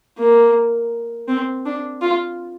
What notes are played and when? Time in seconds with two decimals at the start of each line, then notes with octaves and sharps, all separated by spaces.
0.18 A#3
1.28 C4
1.66 D4
2.01 F4